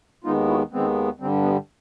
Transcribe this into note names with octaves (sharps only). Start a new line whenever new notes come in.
D#2 D#3 G#3 B3 D#4 F4
E4 F#4
D#2 D#3 G#3 B3 C4
G2 D3 G3 C4
B3